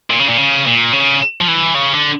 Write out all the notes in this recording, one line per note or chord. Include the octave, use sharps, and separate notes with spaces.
A#2
C#3
A#2
C#3
A#2
C#3
F3
E3
C#3
D3